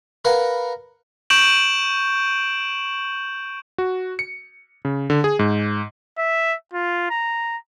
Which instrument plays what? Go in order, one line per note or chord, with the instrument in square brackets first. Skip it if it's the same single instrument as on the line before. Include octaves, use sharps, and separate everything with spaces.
[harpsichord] A#4 B4 F5 F#5
[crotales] C#6 G6 D7 E7 F#7
[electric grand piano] F#4
C#7
C#3
D3
G#4
G#2
[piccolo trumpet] E5
F4
A#5